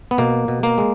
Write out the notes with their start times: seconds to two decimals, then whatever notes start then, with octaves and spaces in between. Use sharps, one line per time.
0.11 B3
0.18 B2 A#3
0.48 B2
0.63 A#3
0.78 G#3